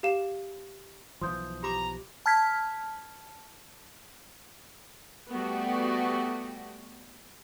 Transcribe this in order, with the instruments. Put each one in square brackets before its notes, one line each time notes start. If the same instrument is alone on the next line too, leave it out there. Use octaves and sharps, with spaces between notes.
[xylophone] G4 F5 E7
[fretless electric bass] B1 E3 F3 [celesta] C6 D#6 G6
[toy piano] G4 B5 D6 [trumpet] A#5
[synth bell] A5 F6 G#6 B6
[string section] G3 A3 B3 F#4 G4